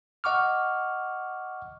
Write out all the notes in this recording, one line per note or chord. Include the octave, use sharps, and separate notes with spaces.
D#5 F#5 C#6 D6 F6